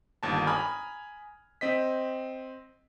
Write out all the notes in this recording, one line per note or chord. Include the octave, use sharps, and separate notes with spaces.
G1 D#2 A5
G#5 A#5 B5 D#6 F6 G#6
C4 D#5 B6